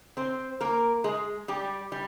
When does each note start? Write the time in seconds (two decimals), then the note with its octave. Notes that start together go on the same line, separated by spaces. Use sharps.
0.17 C4 C5
0.61 A#3 A#4
1.04 G#3 G#4
1.48 G3 G4
1.92 G3